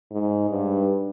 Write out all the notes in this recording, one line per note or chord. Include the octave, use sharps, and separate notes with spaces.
G#2
G2